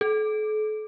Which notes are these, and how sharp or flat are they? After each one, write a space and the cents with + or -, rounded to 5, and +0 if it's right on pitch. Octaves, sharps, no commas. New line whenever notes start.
A4 -40